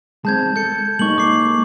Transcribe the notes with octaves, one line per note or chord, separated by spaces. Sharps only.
G#3 C4 A5 G6 G#6
A4 G6 C#7
G#3 A#3 D#4 C#6 F#7
D6 C7